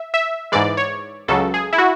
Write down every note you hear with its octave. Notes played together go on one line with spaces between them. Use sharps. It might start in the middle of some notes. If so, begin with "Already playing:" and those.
Already playing: E5
E5
G#2 E3 G#3 D5
C#5
C#2 C#3 F#3 A4
G#4
E4
F#4